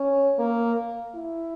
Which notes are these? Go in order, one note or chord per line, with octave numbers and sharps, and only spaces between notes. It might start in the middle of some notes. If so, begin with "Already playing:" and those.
Already playing: C#4
A#3
E4